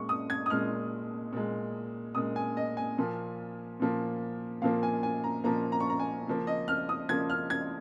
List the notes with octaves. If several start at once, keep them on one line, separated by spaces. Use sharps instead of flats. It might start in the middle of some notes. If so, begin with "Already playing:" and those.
Already playing: A#2 G#3 C#6
D#6
G#6
D#6
A#2 G#3 F6
A#2 G#3
A#2 G#3 D#6
G#5
D#5
G#5
A#2 F3 A#3
A#2 F3 A#3
A#2 F3 A#3 F5
G#5
G#5
A#5
A#2 F3 A#3 A#5
A#5
C#6
A#5
G#5
C#3 F3 A#3
D#5
F6
D#6
C#3 F3 A#3 G#6
F6
G#6